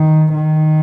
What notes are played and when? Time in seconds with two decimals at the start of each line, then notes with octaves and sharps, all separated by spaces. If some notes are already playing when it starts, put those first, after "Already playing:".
Already playing: D#3
0.33 D#3